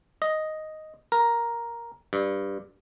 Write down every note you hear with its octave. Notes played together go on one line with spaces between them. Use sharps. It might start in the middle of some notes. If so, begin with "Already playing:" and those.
D#5
A#4
G2